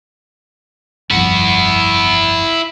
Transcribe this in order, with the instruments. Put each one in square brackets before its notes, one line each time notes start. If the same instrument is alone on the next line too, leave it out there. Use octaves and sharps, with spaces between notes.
[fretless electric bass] G1 C2 F2 [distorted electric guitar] E4 F#5